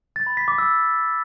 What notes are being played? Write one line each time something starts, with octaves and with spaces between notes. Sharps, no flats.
A6
B5
B6
D6
E6